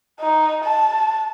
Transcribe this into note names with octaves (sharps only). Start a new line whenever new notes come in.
D#4
A5